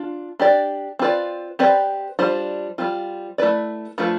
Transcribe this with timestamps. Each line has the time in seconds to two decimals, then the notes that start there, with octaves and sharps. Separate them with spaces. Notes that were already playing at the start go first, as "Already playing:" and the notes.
Already playing: D4 F4
0.39 D4 G4 D5
0.99 C4 F4 B4 D5
1.59 C4 G4 B4 D5
2.19 G3 D4 F4 C5
2.78 G3 C4 F4
3.38 A3 E4 B4 D5
3.98 F3 A3 D4 F4 B4